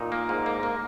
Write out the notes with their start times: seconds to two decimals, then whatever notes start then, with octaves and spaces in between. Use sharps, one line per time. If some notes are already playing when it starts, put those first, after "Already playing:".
Already playing: A#2 D#4
0.12 A#3
0.29 G#2
0.46 A#3
0.63 A#3